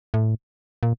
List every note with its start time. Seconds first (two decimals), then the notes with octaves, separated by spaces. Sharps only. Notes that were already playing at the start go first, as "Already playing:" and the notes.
0.14 A2
0.83 A#2